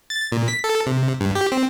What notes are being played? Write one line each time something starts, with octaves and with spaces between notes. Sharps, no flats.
A6
A#2
B6
A4
C3
G2
G4
C4